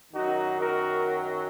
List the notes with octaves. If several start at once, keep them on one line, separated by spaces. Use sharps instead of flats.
F#2 D#3 F#3 D#4 F#4
F#4 A#4